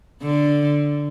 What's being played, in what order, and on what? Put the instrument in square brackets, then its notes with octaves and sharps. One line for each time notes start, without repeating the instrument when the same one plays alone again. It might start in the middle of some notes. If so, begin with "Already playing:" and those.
[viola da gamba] D3